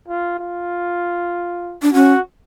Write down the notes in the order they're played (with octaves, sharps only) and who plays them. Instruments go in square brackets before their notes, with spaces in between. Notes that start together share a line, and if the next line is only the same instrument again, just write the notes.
[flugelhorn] F4
F4
[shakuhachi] D4
[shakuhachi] C#4 [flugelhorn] F#4